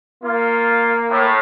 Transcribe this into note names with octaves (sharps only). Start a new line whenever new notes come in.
A#3 F4
A2